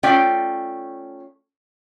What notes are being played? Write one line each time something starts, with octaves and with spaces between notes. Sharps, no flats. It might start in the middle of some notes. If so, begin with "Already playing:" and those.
A3 C#4 F4 D5 G5